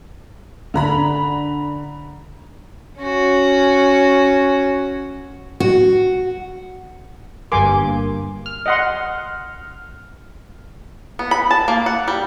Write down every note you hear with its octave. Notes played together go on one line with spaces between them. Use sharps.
D3 A#5 B5
C#4 F#4
F#4
G1 G2 A#3 G#5 C6 D6
F6
D#5 F#5 C6
B3
B5
A5
A#3
F#5
G3